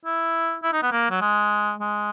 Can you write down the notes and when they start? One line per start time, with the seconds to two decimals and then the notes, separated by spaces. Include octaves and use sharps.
0.05 E4
0.63 E4
0.73 D#4
0.83 B3
0.92 A#3
1.10 F#3
1.21 G#3
1.80 G#3